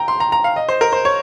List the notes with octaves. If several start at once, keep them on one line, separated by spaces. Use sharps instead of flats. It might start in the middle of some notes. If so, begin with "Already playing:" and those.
Already playing: G5 A#5
C6
A#5
A#5
F5
D#5
C5
A#4
C5
C#5